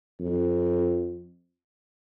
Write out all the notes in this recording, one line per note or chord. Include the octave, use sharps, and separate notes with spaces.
F2